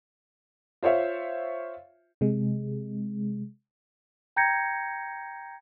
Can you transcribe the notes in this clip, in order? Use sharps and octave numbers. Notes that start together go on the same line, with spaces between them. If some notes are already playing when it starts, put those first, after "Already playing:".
F4 C5 C#5 E5 F5
C3 G#3
G5 A#5 G6 G#6 A#6 C#7